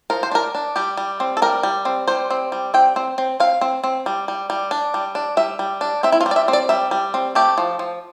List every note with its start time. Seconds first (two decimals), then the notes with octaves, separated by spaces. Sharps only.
0.10 F3 A#4
0.23 C5
0.31 D4 A#4
0.55 D4
0.76 G3 G4
0.97 G3
1.20 C4
1.37 A4
1.42 G3 A#4
1.63 G3
1.85 C4
2.07 G3 C5
2.30 C4
2.52 G3
2.74 C4 G5
2.96 C4
3.18 C4
3.40 C4 F5
3.61 C4
3.84 C4
4.06 G3
4.28 G3
4.50 G3
4.71 D4
4.94 G3
5.15 D4
5.37 G3 E5
5.59 G3
5.81 D4
6.03 C4 E5
6.12 E4
6.21 F4
6.26 G3
6.31 D5
6.36 E5
6.48 C4
6.53 D5
6.69 G3 E5
6.91 G3
7.14 C4
7.35 A3 G4
7.58 F3
7.79 F3